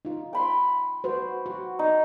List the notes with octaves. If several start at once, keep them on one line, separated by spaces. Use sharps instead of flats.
D#4 F4
G5 B5 C6
F#4 B4 C5
F#4
D#4